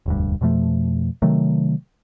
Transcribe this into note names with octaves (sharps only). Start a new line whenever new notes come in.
E1 D2 G2
F2 B2 F3 A3
C3 D#3 F#3 A3